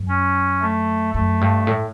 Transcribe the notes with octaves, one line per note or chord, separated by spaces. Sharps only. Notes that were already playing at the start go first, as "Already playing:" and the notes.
Already playing: F#2
C#4
A3
F#2 A3
G2
A2